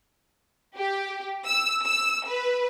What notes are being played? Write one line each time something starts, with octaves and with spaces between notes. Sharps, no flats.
G4
E6
E6
B4